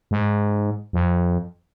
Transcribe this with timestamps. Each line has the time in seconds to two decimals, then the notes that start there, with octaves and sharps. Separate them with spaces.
0.11 G#2
0.93 F2